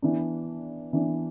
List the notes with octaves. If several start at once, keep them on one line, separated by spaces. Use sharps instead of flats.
E3 B3 D4
E3 B3 D4